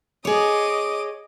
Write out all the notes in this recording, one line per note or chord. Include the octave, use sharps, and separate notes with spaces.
G#4 C#5 D#5 D6 D#6